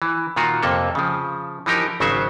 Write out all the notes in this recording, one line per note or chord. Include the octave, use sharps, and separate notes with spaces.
E3
A#2 D#3 F4 F#4
F2 C3 A#3 A4
C#3 F3
E3 F3 D#4 G4 A#4
G#1 C#3 F#3 F#4 C5 E5